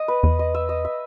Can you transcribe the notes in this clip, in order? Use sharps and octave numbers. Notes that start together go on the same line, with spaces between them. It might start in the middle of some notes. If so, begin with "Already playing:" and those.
Already playing: D#5
B4
E2
D#5
E5
D#5
E5